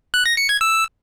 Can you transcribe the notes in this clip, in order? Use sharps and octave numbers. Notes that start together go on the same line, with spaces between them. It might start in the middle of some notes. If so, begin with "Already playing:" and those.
F#6
A#6
C#7
G#6
E6